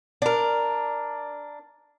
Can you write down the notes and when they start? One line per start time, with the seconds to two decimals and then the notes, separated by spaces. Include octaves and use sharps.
0.22 D4 A#4